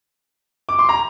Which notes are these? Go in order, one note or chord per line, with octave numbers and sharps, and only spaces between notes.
D6
C6
A#5